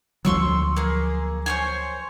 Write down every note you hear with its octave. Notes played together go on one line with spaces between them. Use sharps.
D2 F3 F#3 C6 C#6 E6
A#3 G#4
C5 C#5 G#5